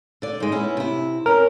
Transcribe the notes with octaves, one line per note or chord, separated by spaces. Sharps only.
D3 D5
G#2 G#3
B3 C#4 E4
C3 E4
C4 C#4 A#4